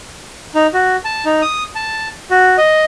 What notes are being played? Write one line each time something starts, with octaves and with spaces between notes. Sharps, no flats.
D#4
F#4
A5
D#4
D#6
A5
F#4
D#5